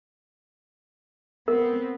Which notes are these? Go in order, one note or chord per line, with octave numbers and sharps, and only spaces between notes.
B3 C4 A#4